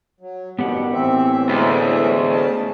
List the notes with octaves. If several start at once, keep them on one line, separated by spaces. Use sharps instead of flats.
F#3
A1 G2 B2 D#3 B3 G4 F#5
A2 E3 C4 E5
A1 D2 G#3
C#4 A5